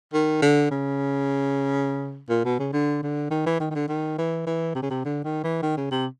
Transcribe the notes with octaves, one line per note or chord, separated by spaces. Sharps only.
D#3
D3
C#3
A#2
B2
C#3
D3
D3
D#3
E3
D#3
D#3
D3
D#3
E3
E3
C3
C#3
C3
D3
D#3
E3
D#3
C#3
C3